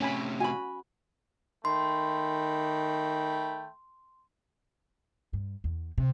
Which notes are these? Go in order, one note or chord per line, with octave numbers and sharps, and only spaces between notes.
A2 C3 C#4 G#5 B5
F#4 G#5 B5
D#3 A3 G5 B5 C6
G2
E2
C3